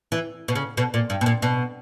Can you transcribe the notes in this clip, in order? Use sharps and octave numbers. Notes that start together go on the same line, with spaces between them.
E3
B2
C#3
B2
A#2
G2
B2
A#2
B2